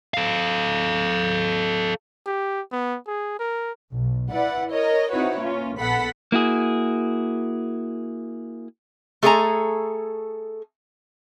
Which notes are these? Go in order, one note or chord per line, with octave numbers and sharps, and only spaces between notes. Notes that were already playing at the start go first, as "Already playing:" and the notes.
A4 F5
G4
B3
G#4
A#4
B1
E4 B4 D5 F#5
A#4 C#5 D#5
C4 D#4 E4 F#4 B4 C#5
A#3 C#4 F4
A#1 B3 A4 F#5 B5 B6
A#3 E4 F#4 G#4
A3 G#4 A4 B4 G#5 A#5